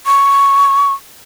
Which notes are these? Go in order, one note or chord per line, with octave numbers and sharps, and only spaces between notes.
C#6